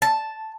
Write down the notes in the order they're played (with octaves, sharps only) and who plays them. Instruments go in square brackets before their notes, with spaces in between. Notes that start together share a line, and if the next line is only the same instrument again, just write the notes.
[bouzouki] A5